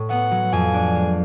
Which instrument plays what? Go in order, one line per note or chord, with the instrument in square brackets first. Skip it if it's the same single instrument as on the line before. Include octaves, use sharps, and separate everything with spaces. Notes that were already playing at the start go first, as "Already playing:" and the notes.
Already playing: [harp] A2
[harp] B3 [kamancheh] F#5
[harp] F#3
[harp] F2 [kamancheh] G#5
[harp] D4
G#3